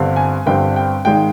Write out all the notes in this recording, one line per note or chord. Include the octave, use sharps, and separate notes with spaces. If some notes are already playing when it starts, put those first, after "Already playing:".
Already playing: G1 G2 D3 G3 C4
G#5
G1 G2 D3 G3 C4 G5
G5
G#1 G#2 D#3 G#3 G5